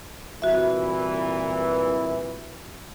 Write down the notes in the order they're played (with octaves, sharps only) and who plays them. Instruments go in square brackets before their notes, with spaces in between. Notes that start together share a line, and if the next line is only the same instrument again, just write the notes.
[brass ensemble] C2 A#2 E3 [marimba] F#4 E5